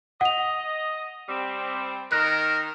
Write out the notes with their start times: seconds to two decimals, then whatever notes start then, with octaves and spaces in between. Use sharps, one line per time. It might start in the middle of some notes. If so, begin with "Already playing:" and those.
0.21 D#5 F#5 F7
1.29 G3 C4
2.12 D#3 A#4 F#6